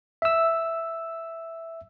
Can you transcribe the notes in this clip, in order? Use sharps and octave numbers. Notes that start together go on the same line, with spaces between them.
E5 E6